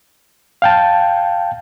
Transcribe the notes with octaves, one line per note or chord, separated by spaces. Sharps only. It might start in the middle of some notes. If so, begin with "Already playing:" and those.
F5 G5 A5